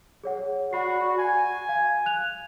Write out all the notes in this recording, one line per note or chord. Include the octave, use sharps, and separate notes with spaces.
G#4 C#5 F#5
F#4 D5 B5 C7
G#5
F5
F#6 F7